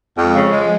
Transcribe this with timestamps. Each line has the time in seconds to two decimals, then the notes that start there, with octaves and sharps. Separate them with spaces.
0.17 F2 F3 G#3
0.35 C#3
0.52 G#3